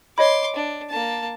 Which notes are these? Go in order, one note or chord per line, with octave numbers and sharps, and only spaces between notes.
C#5 D#5 B5 C6 D6
D4
A#3 A5